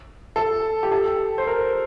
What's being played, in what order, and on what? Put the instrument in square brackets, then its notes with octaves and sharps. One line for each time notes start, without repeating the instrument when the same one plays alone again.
[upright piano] A4
G4
A4
C5
A#4